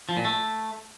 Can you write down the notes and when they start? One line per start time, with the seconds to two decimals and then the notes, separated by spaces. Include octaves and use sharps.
0.09 F3
0.17 A#2
0.25 A3